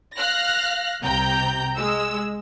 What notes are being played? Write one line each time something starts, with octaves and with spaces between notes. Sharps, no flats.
F5 F6 F#6 A#6
C2 C3 G5 A#5 G6
G#3 E6